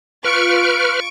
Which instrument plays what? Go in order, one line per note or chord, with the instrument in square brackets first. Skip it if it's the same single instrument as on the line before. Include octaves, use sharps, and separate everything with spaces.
[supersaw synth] F4 [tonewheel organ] B4 F6 [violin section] C#6 D7